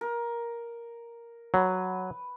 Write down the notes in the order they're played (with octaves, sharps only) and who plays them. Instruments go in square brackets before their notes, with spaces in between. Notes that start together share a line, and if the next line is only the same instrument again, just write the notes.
[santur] A#4
[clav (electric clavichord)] F#3 [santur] B4